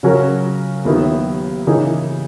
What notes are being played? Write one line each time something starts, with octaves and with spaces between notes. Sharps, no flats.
C#3 F#3 C#4 F#4 A#4
D#2 D#3 F#3 B3 E4
C#3 E3 A#3 D#4 G#4